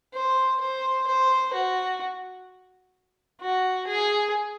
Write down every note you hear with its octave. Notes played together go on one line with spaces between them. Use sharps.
C5
C5
C5
F#4
F#4
G#4